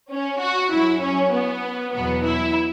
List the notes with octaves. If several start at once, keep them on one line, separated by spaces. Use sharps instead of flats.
C#4
F#4
F#2 F#3 E4
C#4
B3
E2 B2 F#3 B3
E4